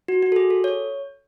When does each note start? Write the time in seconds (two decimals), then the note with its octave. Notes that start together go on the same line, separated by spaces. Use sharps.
0.08 F#4
0.23 F#4
0.32 A4
0.36 G#4
0.50 A4
0.64 C#5